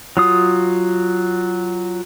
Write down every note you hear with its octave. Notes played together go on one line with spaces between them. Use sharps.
F#3 F4 D#6